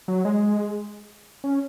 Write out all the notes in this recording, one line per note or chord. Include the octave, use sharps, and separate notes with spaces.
F#3
G#3
C#4